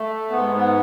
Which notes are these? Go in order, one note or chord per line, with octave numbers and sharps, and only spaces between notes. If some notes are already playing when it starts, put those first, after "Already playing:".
Already playing: A3
G#2 B3
B3